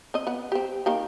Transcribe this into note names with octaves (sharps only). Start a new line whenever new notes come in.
C4 D#5
B3 B4 F#5
C4 G4
D#3 A#3 G4